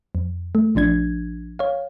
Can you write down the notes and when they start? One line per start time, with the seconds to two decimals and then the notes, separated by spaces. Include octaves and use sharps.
0.15 F2
0.55 A3
0.75 A#1 F3 D4 G#6
1.59 C#5 F5